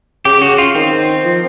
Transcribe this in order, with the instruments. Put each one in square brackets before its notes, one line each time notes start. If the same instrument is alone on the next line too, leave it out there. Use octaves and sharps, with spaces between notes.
[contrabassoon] C#3 [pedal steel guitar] G4
[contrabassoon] C#3 [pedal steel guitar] F#4
[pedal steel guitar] F4
[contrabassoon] D#3 [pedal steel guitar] C4
[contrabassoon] F3